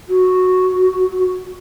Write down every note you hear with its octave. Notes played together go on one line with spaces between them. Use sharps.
F#4